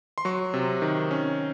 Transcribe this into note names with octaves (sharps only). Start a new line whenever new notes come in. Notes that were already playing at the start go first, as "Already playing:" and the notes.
C6
F#3 C#6
C3
D#3
C#4